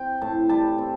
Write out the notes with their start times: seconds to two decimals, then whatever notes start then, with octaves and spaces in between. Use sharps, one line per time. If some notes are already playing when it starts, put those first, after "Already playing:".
Already playing: C4 G5
0.22 A2 A5
0.49 G3 A5
0.78 C4